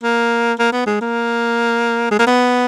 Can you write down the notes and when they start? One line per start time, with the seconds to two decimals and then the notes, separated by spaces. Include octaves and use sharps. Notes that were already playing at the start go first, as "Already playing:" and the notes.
0.03 A#3
0.59 A#3
0.72 B3
0.86 G#3
1.01 A#3
2.11 G#3
2.19 A#3
2.27 B3